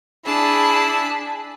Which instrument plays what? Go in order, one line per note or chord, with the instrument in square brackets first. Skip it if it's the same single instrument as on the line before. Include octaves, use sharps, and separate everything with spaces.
[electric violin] D4 G#4 [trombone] E4 [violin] A5 B5